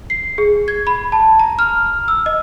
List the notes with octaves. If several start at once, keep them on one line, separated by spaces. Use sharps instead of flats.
C7
G#4
G#6
B5
A5
A#5
F6
E6
D#5